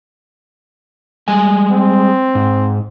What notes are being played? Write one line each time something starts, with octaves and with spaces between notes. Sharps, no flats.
G3 G#3 G#5
C4
G#2